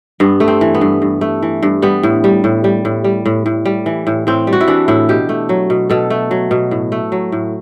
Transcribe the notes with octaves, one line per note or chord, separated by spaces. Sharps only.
G2 B3
A3
C4
E3
B3
G2
G2
A3
E3
G2
G3 B3
A2
G3
A2
G3
A2
G3
A2
A2
G3
E3
A2
A2 C4
G3
F#4
E4
E3 D4
A2 E4
B2 G4
A3
F#3
B2
B2 A4
A3
F#3
B2
A2
A3
F#3
A2